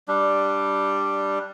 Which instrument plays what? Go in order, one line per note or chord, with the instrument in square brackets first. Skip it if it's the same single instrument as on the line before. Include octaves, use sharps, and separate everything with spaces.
[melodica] G3 D4